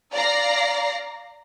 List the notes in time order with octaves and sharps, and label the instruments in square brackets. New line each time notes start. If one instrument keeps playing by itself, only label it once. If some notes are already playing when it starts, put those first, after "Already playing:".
[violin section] D5 F5 A#5 A#6 C7